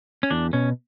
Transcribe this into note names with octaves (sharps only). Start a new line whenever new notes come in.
C#4
E2 D4
B2 C#4